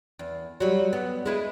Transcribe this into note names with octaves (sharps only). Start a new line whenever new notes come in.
E2
F#3 G3
B3
G#3 E4 B4